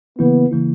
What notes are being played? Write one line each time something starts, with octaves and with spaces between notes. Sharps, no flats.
C#3 E3 A#3 B3 E4
C#3 E3 A#3 E4